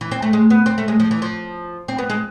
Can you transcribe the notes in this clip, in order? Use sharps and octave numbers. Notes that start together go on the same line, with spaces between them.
E3
C4
A3
G#3
B3
C4
A3
G#3
F3
E3
F3
C4
B3
G#3